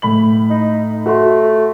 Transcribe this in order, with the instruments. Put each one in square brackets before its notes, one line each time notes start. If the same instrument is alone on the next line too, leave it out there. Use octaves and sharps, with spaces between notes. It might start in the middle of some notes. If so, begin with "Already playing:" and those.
[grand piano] A2 B5 F#7
[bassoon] D#4
[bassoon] A3 [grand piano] F#4 C6